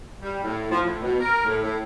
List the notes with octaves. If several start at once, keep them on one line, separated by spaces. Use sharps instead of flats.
G3
A2
F3
A2
B2
A#4
A2
A2